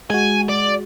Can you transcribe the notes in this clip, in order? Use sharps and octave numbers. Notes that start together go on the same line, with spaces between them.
G#3 F#4 G#5
D5